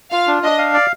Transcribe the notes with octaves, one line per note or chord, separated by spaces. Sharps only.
F4 F5
D4
D4 D#5
F5
D5